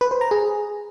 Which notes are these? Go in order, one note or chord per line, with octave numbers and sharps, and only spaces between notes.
B4
C5
A#5
G#4